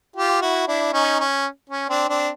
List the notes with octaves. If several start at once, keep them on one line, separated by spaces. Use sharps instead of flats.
F4 G4
E4 F#4
D4 E4
C#4 D#4
C#4
C#4
C4 D4
C4 D4